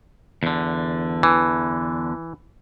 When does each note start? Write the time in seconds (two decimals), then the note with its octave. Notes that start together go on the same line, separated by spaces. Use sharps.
0.43 E2 D3
1.23 E3